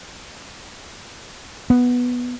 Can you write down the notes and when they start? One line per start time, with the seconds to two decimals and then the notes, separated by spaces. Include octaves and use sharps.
1.70 B3